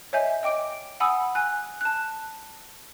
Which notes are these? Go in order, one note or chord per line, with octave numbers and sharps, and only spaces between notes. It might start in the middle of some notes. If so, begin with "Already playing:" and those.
C#5 D#5 E5 G#5 G6
D#5 G5 D6 D7
F#5 G#5 B5 D#6 E6
G#5 F#6
A5 F#6